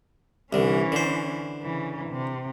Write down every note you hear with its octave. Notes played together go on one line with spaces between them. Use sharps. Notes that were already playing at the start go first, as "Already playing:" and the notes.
C2 D3 E3 C#4
D3 C5
C#3 E3
C3